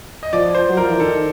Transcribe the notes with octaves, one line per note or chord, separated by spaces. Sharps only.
D#5
F3 D5
C5
F#3
F3 A#4
E3
D#3 A4